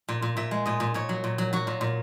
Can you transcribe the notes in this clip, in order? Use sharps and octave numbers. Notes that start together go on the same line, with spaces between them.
A#2
A#2
A#2 E5
G#3
A#2 D#5
A#2
A#2 C#5
F#3
A#2
F#3
F#3 F#4
A#2
A#2